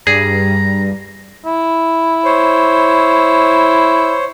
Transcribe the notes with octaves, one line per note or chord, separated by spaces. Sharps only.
G2 G3 G#4 A#5
E4
C5 C#5